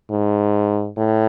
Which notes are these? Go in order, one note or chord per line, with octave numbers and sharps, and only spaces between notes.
G#2
A2